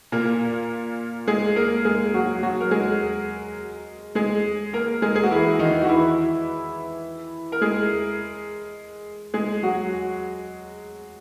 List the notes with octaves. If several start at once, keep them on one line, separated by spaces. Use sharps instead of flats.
A#2 A#3
G#3 G#4
A#3 A#4
G#3 G#4
F#3 F#4
F#3 F#4
A#4
G#3 G#4
G#3 G#4
A#3 A#4
G#3 G#4
G#4
F#4
E3 E4
D#3 D#4
F#4
E3 E4
A#4
G#3 G#4
G#3 G#4
F#3 F#4